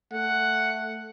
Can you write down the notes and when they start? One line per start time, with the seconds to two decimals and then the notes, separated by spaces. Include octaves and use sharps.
0.13 A3 F#5